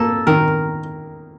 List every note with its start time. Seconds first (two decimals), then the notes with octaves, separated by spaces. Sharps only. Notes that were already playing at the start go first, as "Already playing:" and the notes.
Already playing: A#3 A4
0.27 D#3 A#4